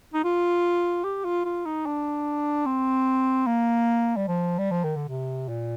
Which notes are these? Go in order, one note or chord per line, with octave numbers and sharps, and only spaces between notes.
D#4
F4
G4
F4
F4
D#4
D4
C4
A#3
G3
F3
G3
F3
D#3
D3
C3
A#2